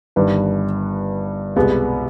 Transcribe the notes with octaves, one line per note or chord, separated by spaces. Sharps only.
G1 G2 D#3 B4
C2 B2 G#3 B3